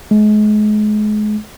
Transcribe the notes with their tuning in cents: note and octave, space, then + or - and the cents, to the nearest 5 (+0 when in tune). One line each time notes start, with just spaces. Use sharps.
G#3 +35